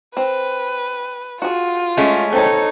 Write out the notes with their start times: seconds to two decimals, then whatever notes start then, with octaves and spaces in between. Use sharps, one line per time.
0.17 C4 B4
1.42 F4 F#4 G#4
1.97 G#3 A3 C#4
2.32 C4 D#4 A4 C#5 A5